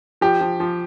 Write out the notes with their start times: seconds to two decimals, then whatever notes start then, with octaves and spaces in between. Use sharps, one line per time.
0.21 F3 G4
0.41 F3
0.60 F3